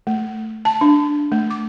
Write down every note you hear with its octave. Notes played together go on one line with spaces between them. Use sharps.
A3
A5
D4
A3
D6